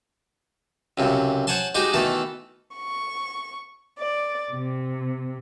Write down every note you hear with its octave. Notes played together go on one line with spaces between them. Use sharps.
C#2 F#2 C3
C5 C#5 F#5 G#5 A5 C6
G#3 D#4 F#4 G4 C5 G#5
B2 D#3 E3 A3 A4
C#6
D5
C3